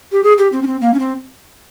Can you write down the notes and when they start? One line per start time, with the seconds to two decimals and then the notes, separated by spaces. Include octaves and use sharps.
0.12 G4
0.24 G#4
0.38 G4
0.52 C4
0.62 C#4
0.67 C4
0.81 A#3
0.94 C#4
1.00 C4